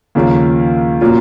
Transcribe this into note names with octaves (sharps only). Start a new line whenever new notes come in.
D#2 C#3 F3 A#3 C#4
A#2 F#3 A#3 C#4 F4